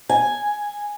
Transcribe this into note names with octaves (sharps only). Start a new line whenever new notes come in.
G#5